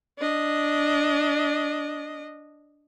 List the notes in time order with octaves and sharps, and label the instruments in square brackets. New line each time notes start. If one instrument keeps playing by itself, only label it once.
[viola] D4 D#5